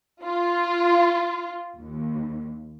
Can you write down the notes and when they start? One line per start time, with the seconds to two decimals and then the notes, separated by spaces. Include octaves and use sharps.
0.23 F4
1.79 D#2